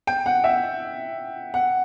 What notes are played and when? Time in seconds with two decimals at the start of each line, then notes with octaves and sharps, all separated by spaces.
0.07 G5
0.26 F#5
0.44 E5
1.54 F#5